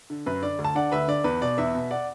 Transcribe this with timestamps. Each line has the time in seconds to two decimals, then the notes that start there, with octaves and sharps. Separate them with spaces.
0.10 D3
0.26 F#2 B4
0.42 D3 D5
0.58 D2
0.65 A5
0.75 D3 D5 F#5
0.92 D2 B4 E5
1.08 D3 D5
1.24 E2 B4
1.41 B2 D5
1.57 E2 B4 E5
1.75 B2
1.91 D5 F#5